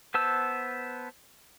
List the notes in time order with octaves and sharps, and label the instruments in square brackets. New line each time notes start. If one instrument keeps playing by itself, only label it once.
[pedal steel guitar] B3 B4 C5 A5 E6